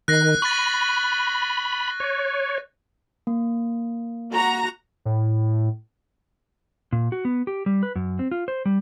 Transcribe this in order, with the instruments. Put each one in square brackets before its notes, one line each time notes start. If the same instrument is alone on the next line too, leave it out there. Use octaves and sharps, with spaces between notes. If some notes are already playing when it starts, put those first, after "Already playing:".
[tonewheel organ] D#3 [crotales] F#6 A#6 C7
[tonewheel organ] B5 [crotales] C#6 A6
[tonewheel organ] C#5
[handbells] A#3
[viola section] F#4 A#5
[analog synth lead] A2
[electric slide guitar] A#2
F#4
B3
G4
G3
B4
F#2
C4
F4
C5
G3